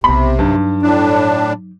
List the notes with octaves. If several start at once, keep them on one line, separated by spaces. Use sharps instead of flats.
B1 C3 B3 B5
G2 F#3 D#4
A2 D4